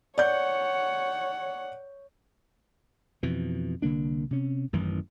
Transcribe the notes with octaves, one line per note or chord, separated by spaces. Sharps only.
C#5 D5 F#5 G6
F2 B2 E3
C2 D3 A#3 D4
C3 C#4
A1 F#2 D#3 E3